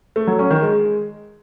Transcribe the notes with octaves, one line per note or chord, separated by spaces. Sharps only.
A3
F#3
C#4
D#3
G#3